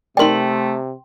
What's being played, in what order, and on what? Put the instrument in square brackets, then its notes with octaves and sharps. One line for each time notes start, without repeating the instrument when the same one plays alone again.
[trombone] C3 [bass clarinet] A3 [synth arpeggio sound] D#4 A#4 D5 [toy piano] G5 C6